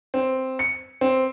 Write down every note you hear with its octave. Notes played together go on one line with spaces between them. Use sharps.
C4
C#7
C4